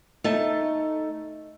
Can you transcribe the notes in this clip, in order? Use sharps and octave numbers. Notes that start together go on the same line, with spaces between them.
A3 D#4 A5